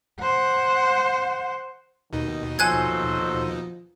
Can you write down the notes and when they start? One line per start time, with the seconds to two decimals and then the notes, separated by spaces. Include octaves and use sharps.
0.20 C5 F#5
2.13 D#2 B2 D#3 D#4
2.59 F3 F#3 A4 C5 G#5 F#6 G#6